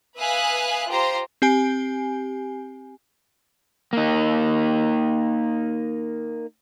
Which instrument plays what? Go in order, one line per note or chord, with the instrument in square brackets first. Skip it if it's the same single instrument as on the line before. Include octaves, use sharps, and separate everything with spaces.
[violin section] B4 E5 F5 G#5 D#6 F#6
F4 G4 C5 A#5 C6
[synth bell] C4 G4 G#5
[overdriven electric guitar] A#3 D#4